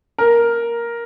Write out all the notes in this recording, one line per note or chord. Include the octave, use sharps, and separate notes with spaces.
A#4